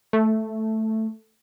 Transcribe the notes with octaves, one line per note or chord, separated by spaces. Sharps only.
A3